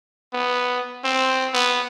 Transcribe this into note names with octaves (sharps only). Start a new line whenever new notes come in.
B3
C4
B3